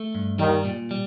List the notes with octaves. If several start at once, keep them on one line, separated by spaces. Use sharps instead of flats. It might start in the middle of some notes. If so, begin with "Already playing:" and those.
Already playing: A3
G2
D#2 D#3 G3
A#2
G3